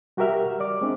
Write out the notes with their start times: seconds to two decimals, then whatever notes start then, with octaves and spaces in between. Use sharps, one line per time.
0.17 G3 F#4 G4 A#4 E5 F6
0.60 D5 D6
0.81 G#3 C4 D4